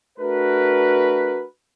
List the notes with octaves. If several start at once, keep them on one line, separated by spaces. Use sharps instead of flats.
A3 D4 F#4 A#4 B4